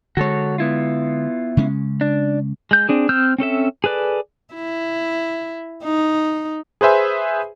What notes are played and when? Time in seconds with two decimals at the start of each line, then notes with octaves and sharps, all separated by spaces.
0.17 D3 G#3 F#4 A4 C#5
0.58 B3 E4 F4
1.57 C#3 G#3 C#4
2.01 D4
2.71 G#3 G6
2.89 C4 D4 G#4
3.09 C4 E6 F6 G6
3.38 C4 C#4 A4 E5
3.84 G#4 A4 B4 D5
4.54 E4
5.83 D#4
6.81 G#4 B4 C5 E5 G#5